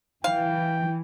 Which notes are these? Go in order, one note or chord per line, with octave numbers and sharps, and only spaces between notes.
E3 F5 G5